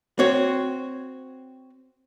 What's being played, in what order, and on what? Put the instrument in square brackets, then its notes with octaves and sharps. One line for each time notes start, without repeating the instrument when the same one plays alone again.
[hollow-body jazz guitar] C4 F#4 C#5